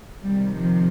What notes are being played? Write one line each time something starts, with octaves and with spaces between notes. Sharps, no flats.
C3 D#3 G3
F3